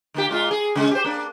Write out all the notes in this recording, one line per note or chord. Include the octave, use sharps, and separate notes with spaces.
D3 A#3 G4
A#2 G#3 F4
G#4
C#3 G#3
G4 C5
A#3 D4